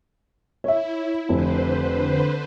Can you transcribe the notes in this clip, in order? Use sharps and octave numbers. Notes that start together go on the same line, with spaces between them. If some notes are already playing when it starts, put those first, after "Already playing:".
E4 C#5 E5
F1 D3 B4 C5